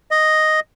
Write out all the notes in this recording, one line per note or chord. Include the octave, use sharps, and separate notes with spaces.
D#5